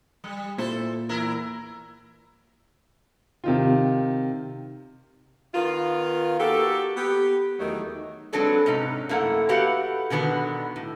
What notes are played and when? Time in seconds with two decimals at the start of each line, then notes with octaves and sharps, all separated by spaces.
0.24 G3
0.58 A#2 E4 A4 C5
1.09 E2 E4 A#4
3.44 C3 D#3 F4
5.54 D#3 B3 F4
6.39 A#3 F#4 G4 A4
6.97 B3 G4
7.59 E2 D#3 F#3 A3 D#4
8.33 F#3 G#3 C4 D4 A4 B4
8.66 G#2 C3 C#4 D#4
9.09 F#2 A3 A#3 E4 F#5
9.49 F#4 G4 A4 B4 F5 F#5
10.10 B2 D3 D#3 B3 F#4
10.76 A2